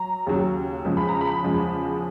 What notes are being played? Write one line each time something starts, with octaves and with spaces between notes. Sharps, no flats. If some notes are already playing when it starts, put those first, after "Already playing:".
Already playing: F#3 A#5
D#2 C#3 F#3
E2 C#3 F3 G#3
B5
A#5
B5
E2 C#3 F3 G#3